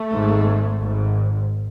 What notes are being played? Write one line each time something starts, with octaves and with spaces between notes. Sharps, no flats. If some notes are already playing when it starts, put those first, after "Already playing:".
Already playing: A3
G#1 G#2
G#1 G#2